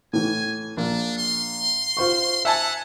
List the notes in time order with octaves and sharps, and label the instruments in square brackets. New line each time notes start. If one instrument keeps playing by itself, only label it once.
[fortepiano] A2 E3 [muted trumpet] G#5
[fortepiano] A#1 [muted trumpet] D4
[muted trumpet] C6
[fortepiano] F4 C5 C#6
[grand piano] E5 G#5 A5 [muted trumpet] F#5 [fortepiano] E6